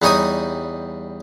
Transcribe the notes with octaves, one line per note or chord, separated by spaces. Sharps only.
E2 G3 D#4 C#5 G#5 D#6